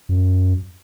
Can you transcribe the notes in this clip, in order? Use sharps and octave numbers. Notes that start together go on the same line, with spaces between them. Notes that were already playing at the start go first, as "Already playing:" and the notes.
F#2